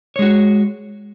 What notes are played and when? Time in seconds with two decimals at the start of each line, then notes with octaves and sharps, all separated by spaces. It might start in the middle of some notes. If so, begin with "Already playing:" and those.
0.16 C#5
0.19 G#3
0.22 F#4